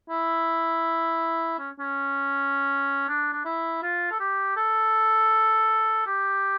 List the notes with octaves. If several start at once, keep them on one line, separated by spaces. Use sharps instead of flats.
E4
C#4
C#4
D4
D4
E4
F4
A4
G4
A4
G4